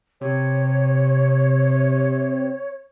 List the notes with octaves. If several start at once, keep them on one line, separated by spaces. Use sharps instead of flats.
C3 C#5